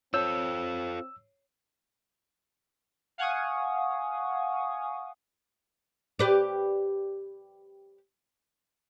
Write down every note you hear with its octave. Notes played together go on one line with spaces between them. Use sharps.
C4 F4 A4 C#5 E6
F5 F#5 G#5 C#6 D#6
G4 B4 D5